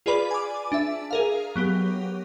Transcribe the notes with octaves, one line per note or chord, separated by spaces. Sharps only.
F4 G#4 B4 D5 B5
G#5 D6
D4 E5
G#4 A#4 F5
F#3 B3 G4